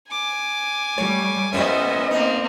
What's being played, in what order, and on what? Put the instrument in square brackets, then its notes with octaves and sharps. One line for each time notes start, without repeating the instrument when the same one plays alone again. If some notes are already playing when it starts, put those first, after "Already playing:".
[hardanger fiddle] G#5 [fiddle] D6
[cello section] G3 A3 [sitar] C#5
[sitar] A2 G3 C#4 [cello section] B3 D#5 [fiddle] C5 E5
[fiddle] A#3 C4 [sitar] D#4